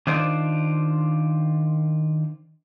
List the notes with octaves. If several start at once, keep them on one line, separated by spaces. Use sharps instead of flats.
D#3 D4 F4 C5 D5